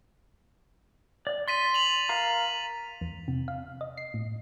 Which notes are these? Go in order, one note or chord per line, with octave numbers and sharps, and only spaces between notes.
D5
C6 A6 B6 D#7
F7 F#7
A#4 F5 A#5
E2
C3
F5
D#5
C7
A2